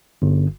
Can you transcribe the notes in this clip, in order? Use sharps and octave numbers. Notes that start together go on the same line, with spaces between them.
G1